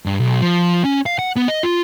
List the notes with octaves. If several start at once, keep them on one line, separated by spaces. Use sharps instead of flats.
G2
B1
F3
C#4
F5
F#5
B3
D#5
F4